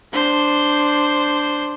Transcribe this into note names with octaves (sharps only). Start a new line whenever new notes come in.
D4 C5